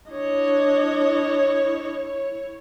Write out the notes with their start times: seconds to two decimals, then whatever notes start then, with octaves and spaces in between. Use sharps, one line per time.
0.10 D4 E4 C#5 D#5